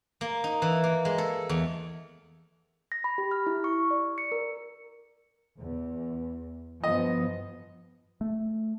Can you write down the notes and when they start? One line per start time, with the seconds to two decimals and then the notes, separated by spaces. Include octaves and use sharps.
0.21 A#3
0.44 D#4
0.62 E3
0.84 A#3
1.05 G#3
1.18 A4
1.49 E2
2.92 A#6
3.04 B5
3.18 G4
3.31 F6
3.47 E4
3.64 C#6
3.91 D5
4.18 C#7
4.32 A#4
5.58 E2
6.84 G2 F3 B3 D#5
8.21 A3